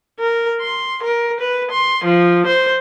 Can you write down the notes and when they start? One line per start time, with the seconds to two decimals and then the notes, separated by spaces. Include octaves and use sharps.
0.19 A#4
0.61 C6
1.03 A#4
1.41 B4
1.71 C6
2.04 F3
2.47 C5